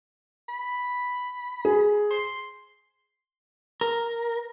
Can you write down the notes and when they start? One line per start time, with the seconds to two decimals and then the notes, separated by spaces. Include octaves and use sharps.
0.49 B5
1.65 G#4
2.11 C6
3.81 A#4